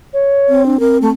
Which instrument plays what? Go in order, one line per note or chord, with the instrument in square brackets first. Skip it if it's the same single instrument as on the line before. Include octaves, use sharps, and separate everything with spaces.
[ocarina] C#5
[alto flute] C4
[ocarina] D4
[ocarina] C4 [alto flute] A#4
[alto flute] A3